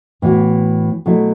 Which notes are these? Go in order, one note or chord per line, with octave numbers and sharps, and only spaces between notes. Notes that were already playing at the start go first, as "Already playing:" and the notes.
A2 E3 B3 F#4
B2 F#3 A3 E4